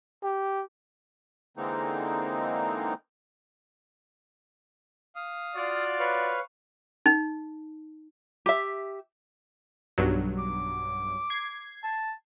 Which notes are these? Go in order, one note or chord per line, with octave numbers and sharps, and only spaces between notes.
G4
D3 E3 G#3 A#3 C4 D#4
F5 D#6
F4 F#4 D5
B4 C#5 F5
D#4
G4 E5
B1 G2 F#3
D6
G#6 C7
A5